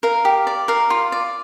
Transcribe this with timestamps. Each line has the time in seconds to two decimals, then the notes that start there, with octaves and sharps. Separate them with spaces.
0.03 A#4 F5
0.25 G4
0.47 D5
0.68 A#4 F5
0.90 F4
1.12 D5